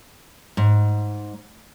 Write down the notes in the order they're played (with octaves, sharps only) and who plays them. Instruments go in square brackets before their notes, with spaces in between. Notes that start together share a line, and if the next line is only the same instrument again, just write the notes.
[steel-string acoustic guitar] G#2